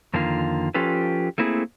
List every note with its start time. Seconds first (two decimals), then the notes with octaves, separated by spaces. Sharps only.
0.14 F2 D3 D#3 A#3 F4
0.74 F3 C#4 F4 G4 A4 B4
1.38 A3 A#3 C4 E4 F#4 G#4